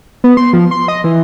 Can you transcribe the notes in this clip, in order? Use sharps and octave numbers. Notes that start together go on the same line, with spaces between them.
B3
C6
F3
C6
D#5
E3